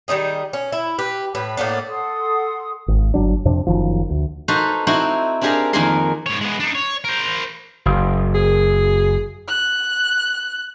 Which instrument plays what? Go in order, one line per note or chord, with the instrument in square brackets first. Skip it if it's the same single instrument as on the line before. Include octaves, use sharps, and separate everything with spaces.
[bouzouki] D#3 G3 D#4 G#4
C#4
E4
G4 B4
A2 B4
A2 A#3 B3 D4
[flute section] A4 F#5 C6 D#6
[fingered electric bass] G#1
G1 F#3 D4
F2 C3 C4 D4
F#1 D#3 F3
D2
[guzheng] D#4 F#4 A4 B4 C5 F5
C4 D#4 E4 F#4 C5
C4 D4 G4 G#4 A#4 F5
F2 D#3 A#3 G#4 A#4 C6
[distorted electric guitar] G#2 C#5
G#3 B3
D4 D#4
C#5
A#4 C5
[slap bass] F#1
[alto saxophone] G#4
[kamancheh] F#6